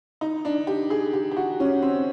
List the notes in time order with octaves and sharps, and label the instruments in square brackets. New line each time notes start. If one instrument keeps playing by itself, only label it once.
[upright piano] D#4
D4
G4
G#4
G4
G4
F#4
C#4
C4